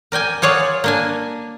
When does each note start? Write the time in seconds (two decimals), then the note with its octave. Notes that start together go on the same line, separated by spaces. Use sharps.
0.12 A#4 D5 G5 G#5
0.42 F4 G#4 C#5 D5 F#5
0.84 A#3 D4 G#5